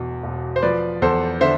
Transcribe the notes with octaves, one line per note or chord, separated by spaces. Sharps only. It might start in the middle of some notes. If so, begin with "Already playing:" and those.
Already playing: E1 E2 B2
E1
C5
F3 B4 D5
E2 A4 C5
D3 C5 E5